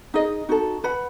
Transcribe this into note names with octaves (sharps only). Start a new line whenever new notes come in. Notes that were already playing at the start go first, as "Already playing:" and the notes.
D#4 G#4 D#5
D#4 F#4 A4
B4 F#5 B5